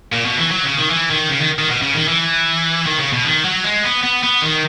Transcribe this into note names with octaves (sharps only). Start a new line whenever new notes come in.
A#2
B2
E3
F#3
C#3
D#3
E3
D#3
C#3
D#3
D#3
B2
C#3
D#3
E3
D#3
C#3
B2
D#3
F#3
G#3
B3
B3
B3
D#3